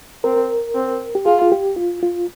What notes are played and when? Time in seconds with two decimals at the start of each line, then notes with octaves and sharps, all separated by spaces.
0.24 C4 A#4
0.75 C4
1.15 G4
1.26 F4 G#4
1.42 F4
1.52 G4
1.76 F4
2.03 F4